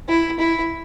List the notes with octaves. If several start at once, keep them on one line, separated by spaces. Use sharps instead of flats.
E4
E4